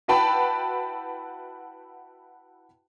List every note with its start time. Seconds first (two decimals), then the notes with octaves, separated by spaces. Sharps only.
0.08 E4 F#4 B4 G5 A5 B5